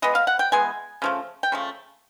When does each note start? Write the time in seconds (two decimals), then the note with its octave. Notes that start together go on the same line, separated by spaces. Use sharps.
0.02 E3 G#3 B3 D#5
0.15 F5
0.27 F#5
0.39 G5
0.52 E3 G#3 B3 G#5
1.02 C#3 F3 A3
1.43 G5
1.52 C#3 F3 A3